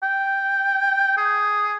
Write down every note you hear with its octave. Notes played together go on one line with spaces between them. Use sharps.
G5
G#4